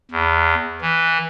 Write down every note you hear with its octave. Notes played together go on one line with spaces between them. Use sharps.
E2
E3